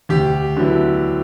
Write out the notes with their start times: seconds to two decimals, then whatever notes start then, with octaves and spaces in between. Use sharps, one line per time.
0.09 D2 G4
0.57 D3 F#3 B3 E4